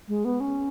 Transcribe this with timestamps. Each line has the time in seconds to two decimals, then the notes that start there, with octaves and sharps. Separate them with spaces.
0.08 G#3
0.25 B3
0.40 C#4